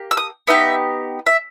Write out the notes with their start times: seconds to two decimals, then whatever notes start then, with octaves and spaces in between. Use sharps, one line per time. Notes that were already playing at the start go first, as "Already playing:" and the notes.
Already playing: A#3 G4
0.11 E6
0.17 D#6
0.47 B3 D#4 G4 E5
1.26 E5